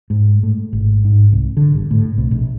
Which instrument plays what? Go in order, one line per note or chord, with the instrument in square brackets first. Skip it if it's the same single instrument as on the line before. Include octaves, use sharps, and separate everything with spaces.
[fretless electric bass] G#2
A2
G#1
G#2
C2
D3
G1
A2
C2
A#1